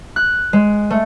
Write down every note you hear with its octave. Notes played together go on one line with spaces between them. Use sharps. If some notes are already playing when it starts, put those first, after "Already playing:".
F#6
G#3
A3